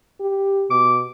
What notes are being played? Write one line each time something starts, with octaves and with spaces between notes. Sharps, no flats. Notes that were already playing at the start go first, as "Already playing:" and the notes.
G4
B2 D6